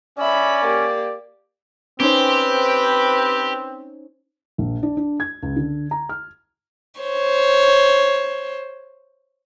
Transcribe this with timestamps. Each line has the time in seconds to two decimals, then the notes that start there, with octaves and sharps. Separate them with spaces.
0.19 C#4 D5 E5 B5
0.65 A#3 G4
2.00 C4 C#4 D#4 G4 B4 C5
4.58 A#1
4.83 D4
4.97 D4
5.20 G#6
5.43 C#2
5.56 D3
5.91 A#5
6.09 F6
7.02 C5 C#5